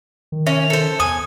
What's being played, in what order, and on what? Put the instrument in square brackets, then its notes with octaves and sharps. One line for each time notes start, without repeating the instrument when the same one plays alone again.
[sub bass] D#3
[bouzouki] C#4 [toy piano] E5
[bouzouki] A4 C5
[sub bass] E2 [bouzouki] G#5 [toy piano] D#6